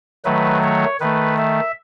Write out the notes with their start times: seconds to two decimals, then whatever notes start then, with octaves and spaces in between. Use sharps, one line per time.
0.25 D#3 F#3 A3 B4
0.63 C#5
1.00 D#3 A3 B4
1.38 E5